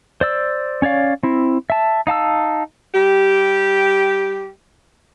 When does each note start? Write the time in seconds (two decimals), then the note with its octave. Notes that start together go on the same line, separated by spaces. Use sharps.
0.21 C5 D5 E6
0.82 C#4 C#5 D5 F5
1.23 C4 E4
1.70 E5 A5
2.07 D#4 F5 A5 E6
2.94 G3 G4